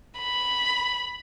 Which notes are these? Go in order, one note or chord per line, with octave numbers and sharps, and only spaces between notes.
B5